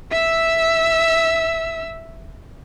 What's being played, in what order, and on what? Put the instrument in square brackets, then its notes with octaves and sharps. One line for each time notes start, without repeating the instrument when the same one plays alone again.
[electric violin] E5 E6